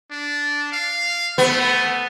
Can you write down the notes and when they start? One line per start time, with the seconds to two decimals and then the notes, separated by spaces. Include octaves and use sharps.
0.11 D4
0.72 F5
1.38 A3 B3